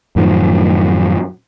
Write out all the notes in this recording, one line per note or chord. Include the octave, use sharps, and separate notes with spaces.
F#2 A2 D#3 F3